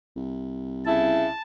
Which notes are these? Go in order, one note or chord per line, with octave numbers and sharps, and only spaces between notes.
C2
C#3 E4 A5